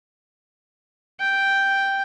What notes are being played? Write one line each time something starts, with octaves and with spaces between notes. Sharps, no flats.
G5